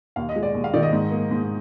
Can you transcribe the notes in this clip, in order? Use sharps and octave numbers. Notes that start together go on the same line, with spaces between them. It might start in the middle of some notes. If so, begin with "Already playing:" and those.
D#2 F5
D#5
G#3
D5
D#2
F5
D#3 D5
D#5
G#2
A#3
G#2